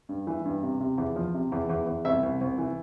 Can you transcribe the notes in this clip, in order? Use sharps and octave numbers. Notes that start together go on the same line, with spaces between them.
G2
E3
G2
C3
C3
E2
F3
C3
E2
E2
E2
C2 E5
C2
C2
E3